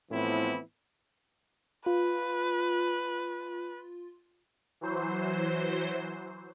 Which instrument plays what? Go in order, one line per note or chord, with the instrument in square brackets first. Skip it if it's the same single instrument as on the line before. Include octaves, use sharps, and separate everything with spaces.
[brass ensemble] A2 E3 F3 B3 C4 E4
[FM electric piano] F4 [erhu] B4
[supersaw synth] E3 F#3 C5